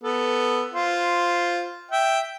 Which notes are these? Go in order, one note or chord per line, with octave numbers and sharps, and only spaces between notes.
B3 A4
F4 C5
E5 G5